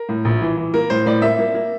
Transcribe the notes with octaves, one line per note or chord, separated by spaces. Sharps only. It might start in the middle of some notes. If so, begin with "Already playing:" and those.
Already playing: A#4
A2
A#1
E3
E3
A#3 A#4
A2 C5
A2 D5
A#3 E5
A#3
A#3